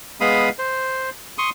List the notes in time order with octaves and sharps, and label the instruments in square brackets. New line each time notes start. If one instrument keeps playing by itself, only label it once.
[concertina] G#3 B3 F5 B5 D#6
C5
C6 C#6 D#6